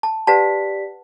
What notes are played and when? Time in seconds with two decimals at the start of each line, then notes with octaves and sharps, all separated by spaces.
0.03 A5
0.27 G4 B4 D5 F#5 A5 B6